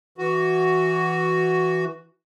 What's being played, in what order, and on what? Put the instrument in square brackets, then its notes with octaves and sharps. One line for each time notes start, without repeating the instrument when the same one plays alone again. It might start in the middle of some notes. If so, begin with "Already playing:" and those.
[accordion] E3 F#4